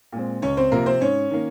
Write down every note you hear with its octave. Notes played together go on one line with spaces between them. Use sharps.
A#2 G#3 C4
C#2 C#4 C#5
C4 C5
C3 F3 A#3 A#4
C4 C5
G#2 C#4 C#5
D#3 A#3